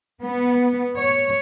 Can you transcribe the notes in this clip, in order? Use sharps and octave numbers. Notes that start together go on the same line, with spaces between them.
B3
C#5